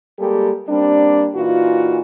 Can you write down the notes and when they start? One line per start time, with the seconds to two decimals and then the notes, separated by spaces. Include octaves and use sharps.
0.19 G3 G#3 A#3 G4 A4
0.68 G3 A#3 C4 D4
1.35 A#2 E3 D#4 F4 F#4